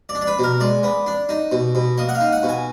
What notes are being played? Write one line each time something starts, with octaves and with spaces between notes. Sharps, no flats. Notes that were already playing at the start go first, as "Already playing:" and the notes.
D5
D4
D5
B4
B2 A#4
G#3 D5
B3
D4
D#4
B2
B2
A#3 D#5
F#5
F5
D#4
F#5
B2
G#5